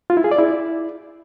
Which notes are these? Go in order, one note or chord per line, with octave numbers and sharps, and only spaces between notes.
F4
E4
G#4
D5
E4